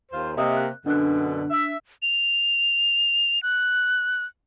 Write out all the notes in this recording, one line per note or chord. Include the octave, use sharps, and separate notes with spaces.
D#2 F4 C5
C3 A#3 D#5 E5 D#6
F#6
F#2 B2 D3 D4 F#6
E5
F7
F#6